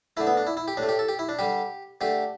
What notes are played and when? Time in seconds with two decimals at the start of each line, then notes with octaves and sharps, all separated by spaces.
0.17 D3 A3 E4
0.27 B3
0.37 D4
0.47 E4
0.57 E4
0.68 G4
0.77 A2 D4
0.83 A3
0.89 G4
0.99 A4
1.08 G4
1.19 E4
1.29 D4
1.39 D3 G3 G4
2.01 D3 A3 G4